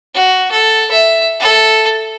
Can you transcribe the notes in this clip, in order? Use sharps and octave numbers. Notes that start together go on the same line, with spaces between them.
F#4
A4
E5
A4